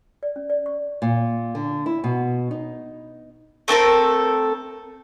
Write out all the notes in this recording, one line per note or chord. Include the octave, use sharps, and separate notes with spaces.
D5
C#4
D5
C#6
A#2
D3
E4
B2
D#4
A3 C4 A4 A#4